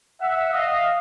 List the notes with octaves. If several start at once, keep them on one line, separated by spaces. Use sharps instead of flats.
E5 F#5
D#5 F5